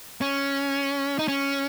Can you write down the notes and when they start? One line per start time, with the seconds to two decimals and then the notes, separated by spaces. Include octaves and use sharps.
0.21 C#4
1.19 D#4
1.28 C#4